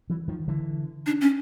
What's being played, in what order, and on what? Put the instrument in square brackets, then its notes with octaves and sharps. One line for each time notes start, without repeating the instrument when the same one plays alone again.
[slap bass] E3 F#3
D#3 F3
D3 E3
[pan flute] D4
C#4